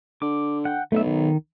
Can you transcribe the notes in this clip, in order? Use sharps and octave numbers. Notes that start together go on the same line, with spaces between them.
D3 D6
F#5 G5
B1 A3 E5
D#3